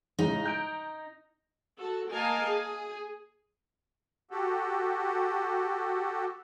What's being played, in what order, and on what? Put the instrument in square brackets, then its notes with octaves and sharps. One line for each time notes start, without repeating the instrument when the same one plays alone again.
[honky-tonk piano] A2 C#3 G#3 [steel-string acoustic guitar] D#4
[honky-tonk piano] A#5 G6 D7
[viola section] F#4 A4
A#3 A#4 D#5 F5 G#5 A5
G#4
[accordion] F#4 G4 A4